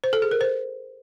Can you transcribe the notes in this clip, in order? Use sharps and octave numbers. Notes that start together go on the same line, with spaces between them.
C5
A4
G#4
A#4
C5